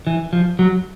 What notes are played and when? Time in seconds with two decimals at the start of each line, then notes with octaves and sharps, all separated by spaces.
0.07 E3
0.33 F3
0.59 F#3